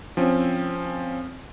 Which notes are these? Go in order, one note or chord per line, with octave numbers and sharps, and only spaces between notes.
F3 C4 C#4